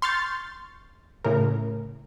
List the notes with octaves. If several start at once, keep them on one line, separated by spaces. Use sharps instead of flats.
C6 C#6 F6 G6 A6 C7
A2 C#3 A#4